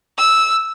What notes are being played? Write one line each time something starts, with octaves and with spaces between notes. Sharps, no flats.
E6